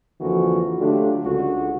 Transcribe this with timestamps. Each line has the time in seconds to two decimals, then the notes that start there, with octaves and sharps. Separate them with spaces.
0.20 F2 D3 E3 F3 A#3 F#4
0.79 D3 F#3 A3 D4 F4 G4
1.25 C#2 D3 F#4